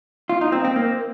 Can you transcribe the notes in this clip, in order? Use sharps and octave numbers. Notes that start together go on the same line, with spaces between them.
F4
D#4
C4
C4
A#3